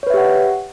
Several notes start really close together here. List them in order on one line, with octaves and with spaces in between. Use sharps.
C#5 B4 E5 G4 F#5